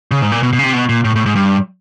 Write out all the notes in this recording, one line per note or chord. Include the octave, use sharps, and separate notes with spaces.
C#3
G#2
A#2
B2
B2
C#3
C3
B2
A#2
A2
A2
G#2
G2